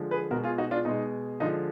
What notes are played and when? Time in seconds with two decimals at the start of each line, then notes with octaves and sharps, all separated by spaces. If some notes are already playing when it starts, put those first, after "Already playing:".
Already playing: D3 F3 G#3
0.11 G#4 B4
0.31 B2 G#3 F#4 A#4
0.44 F4 G#4
0.58 D#4 F#4
0.71 D4 F4
0.85 B2 G#3 D#4
1.40 D3 F3 G#3 D#4